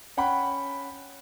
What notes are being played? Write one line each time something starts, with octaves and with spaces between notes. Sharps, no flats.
C#4 F#5 G5 B5